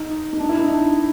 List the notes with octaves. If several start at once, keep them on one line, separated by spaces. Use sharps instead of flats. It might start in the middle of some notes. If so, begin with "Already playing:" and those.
Already playing: D#4
D#4
D4
E4
D#4
D4